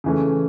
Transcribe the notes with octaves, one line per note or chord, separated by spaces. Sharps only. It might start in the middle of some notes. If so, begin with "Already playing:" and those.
C#3 E3 A3 C#4